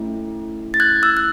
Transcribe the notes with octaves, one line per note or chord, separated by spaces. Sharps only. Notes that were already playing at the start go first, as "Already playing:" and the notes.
Already playing: A3 C#4 E4
A6
F#6 G#6
E6 F#6
F#6